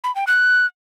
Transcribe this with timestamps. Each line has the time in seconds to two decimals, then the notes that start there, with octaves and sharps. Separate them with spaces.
0.04 B5
0.16 G5
0.27 F#6